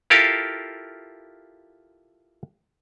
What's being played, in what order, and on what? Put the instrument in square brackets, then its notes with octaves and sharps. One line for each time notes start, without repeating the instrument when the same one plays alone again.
[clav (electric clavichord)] E4 F4 G4 A4 A#4 F5